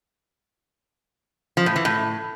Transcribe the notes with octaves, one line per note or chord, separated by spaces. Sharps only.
F3
A2
E3
A2